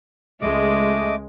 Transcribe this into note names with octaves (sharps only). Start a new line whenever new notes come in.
C#2 G#3 A3 D#5 D6